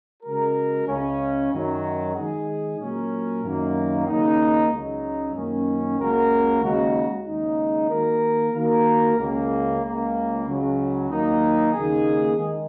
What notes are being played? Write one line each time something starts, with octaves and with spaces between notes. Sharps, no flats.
C#3 G#3 F#4 A#4
C#2 C#3 G#3 C#4
F#2 D#3 F#3
D#3 G#3 D#4 G#4
A#2 F#3 C#4 A#4
F#2 D#3 A#3
D#2 C#3 A#3 D#4
C#2 C#3 F#3 D#4
F#2 D#3 A#3 C#4
C#2 C#3 A#3 F#4 A#4
D#2 C#3 G#3 D#4 F#4
D#2 C#3 G#3 D#4
D#3 A#3 F#4 A#4
D#3 A#3 F#4 A#4
C#2 C#3 A#3
C#2 C#3 A#3
C#2 C#3 F#3
D#2 D#3 F#3 A#3 D#4
D#2 C#3 A#3 D#4 G#4
D#3 G#3